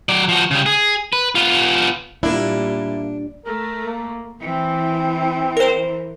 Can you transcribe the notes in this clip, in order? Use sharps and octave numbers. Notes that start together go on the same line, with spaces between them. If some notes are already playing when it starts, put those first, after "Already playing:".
F#3 D5
F3 F#4
C#3 G3
G#4
B4
B3 F4
A#2 G3 A#3 D4 E4
A3 A#4
A#3
E3 C4
A#4 C5